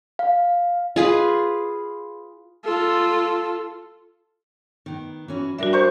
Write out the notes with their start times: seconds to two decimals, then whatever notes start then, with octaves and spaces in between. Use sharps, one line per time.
0.19 F5
0.96 F4 G#4 B4
2.65 F4 A4
4.86 D#3 B3
5.28 E3 C#4 F#4
5.59 G3 D4 F#4 A#4 E5
5.73 F#4 C5 C#6